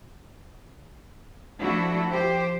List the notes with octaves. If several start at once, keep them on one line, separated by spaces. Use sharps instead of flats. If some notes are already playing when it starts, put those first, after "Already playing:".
F3 A3 D4 E4 F#4
F3 G4 C5